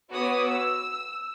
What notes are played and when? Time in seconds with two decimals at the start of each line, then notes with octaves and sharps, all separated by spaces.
0.11 B3 F#4 C#5 D6 D#6
0.48 E6